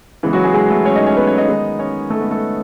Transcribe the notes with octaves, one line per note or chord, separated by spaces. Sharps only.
C#3 E3 G#3 B3 E4
F#3 F#4
G#3 G#4
G#3 G#4
A3 A4
C#4 C#5
D#4 D#5
C#4 C#5
B3 B4
C#4 C#5
D#4 D#5
D#3 G#3 B3
C#4 C#5
A3 A4
B3 B4
A3 A4